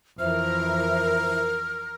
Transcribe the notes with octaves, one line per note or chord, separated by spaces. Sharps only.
F2 E3 E4 A#4 C5 E5 F6